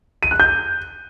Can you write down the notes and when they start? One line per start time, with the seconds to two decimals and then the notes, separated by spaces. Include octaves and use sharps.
0.23 D#7
0.31 F#6
0.40 G6